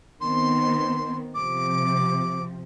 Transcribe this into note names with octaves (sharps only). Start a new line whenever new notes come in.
D#3 B3 C4 C6
C3 F3 D6